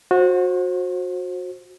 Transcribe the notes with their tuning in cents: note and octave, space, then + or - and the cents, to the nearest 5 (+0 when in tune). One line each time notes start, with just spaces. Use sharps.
F#4 -25 C5 +25